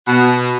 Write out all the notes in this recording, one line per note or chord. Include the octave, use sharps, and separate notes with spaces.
B2